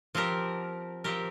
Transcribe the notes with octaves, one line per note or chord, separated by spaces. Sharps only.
F3 C4 G4 A#4
F3 C4 G4 A#4